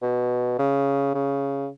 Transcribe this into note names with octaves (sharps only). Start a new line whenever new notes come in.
B2
C#3
C#3